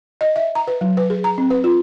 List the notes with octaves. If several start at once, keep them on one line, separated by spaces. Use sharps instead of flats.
D#5
E5
A#5
B4
F#3
B4
G#4
A#5
C4
B4
F4